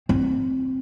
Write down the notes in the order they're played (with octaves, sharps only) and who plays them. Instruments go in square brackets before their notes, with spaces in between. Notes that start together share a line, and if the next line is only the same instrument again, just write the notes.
[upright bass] C4